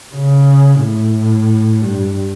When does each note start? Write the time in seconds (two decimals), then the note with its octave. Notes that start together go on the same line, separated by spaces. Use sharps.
0.15 C#3
0.81 A2
1.81 G2